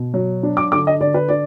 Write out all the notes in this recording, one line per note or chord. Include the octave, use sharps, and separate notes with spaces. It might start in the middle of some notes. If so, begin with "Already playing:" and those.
Already playing: B2
F#3
D4
D6
D3 D6
D#5
D3 D5
B4
D4 D5